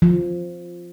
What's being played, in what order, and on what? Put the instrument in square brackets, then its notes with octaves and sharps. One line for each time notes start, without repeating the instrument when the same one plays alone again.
[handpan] F3